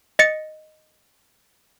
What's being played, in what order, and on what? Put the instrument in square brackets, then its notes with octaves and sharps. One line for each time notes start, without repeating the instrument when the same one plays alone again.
[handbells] D#5 A6 C#7